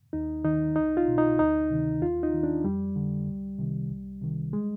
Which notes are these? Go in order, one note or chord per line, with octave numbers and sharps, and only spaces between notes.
D#2 D#4
D#3 D#4
C2 D#4
F4
B2
D#4
D2 D#4
C3 D#3
D#2 F4
D#4
D#3
D4
F2 G3
D3
C2
C3 D#3
C2
C3 D#3
G#3